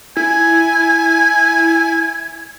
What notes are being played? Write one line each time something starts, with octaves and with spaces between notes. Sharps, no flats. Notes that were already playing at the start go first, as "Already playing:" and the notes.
E4 G#5